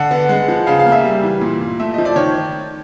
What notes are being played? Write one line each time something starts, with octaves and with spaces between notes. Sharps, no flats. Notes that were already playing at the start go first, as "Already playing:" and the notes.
Already playing: D3 F#5
B3
G#3
F3
C#3 F5
F5
A#3
E5
G3
E3
A#2
A#2
A3 E5
F3 D#5
D5
D#3 C#5